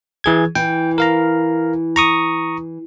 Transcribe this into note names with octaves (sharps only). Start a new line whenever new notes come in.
E3 G#4 G#6
E3 G5
A#4 F5 A#5
A#5 C#6 D#6